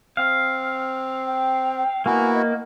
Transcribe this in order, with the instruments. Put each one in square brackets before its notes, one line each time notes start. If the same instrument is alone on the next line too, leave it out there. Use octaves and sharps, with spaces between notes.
[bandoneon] C4 [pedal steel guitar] F5
[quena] G5
[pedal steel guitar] A#3 [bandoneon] B3 E4 F#4 [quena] G#5
[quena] D#5